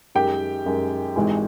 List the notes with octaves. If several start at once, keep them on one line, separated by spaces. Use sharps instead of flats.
F#2 D#3 G#3 G4 G5
F#2 D#3 G#3
G#1 G#2 E3 G#3